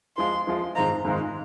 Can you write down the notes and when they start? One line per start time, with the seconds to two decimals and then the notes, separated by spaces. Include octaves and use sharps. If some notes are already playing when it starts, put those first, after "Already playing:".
0.17 F3 G#3 F4 C6
0.47 F3 G#3 F4
0.75 G#2 D#3 G#3 C4 F4 A#5
1.05 G#2 D#3 G#3 C4 F4